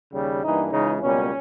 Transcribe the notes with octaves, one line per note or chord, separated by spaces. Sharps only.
D#2 C#3 G3
G2 E3 A#3 D#4
C#2 C#3 E3 G#3 D#4
C#2 B2 G3 A#3 C#4